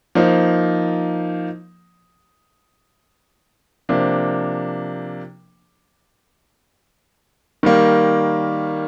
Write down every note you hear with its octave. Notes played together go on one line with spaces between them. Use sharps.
F3 A#3 D#4
C3 F3 A#3 D4
D#3 G3 A#3